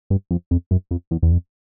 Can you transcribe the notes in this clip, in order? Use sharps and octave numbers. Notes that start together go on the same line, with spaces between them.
G2
F2
F2
F#2
F2
E2
E2
F2